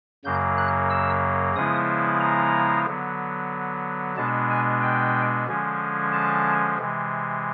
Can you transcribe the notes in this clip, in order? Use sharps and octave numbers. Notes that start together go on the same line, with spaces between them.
F#2 C#3 F#3 A#3 G6
F#6
E6
C#3 F3 G#3 B3 E4 D#6
A#5
D3 F#3 B3
B2 G#3 B3 D4 A5
G#5
G5
D3 F3 G#3 C#4
A5
C3 E3 G#3